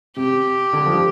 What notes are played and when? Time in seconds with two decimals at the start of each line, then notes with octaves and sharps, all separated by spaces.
0.17 C3 G4
0.73 D3
0.86 F3
0.94 G3